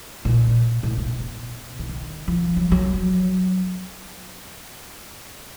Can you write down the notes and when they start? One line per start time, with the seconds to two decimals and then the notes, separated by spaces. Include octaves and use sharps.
0.25 A#2
0.83 A2
0.98 B2
1.79 D3
1.89 D#3
2.28 F3
2.56 F#3
2.72 F#3